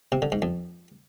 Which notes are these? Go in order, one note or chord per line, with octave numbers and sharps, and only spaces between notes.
C3
D3
G#2
F2